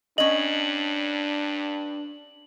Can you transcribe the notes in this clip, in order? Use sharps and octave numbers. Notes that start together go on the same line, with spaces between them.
G2 C#4 D4 D#5 F#7